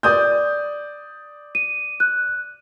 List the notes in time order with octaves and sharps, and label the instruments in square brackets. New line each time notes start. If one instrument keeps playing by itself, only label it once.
[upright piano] D5 D#6 G6
[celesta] D#7
F#6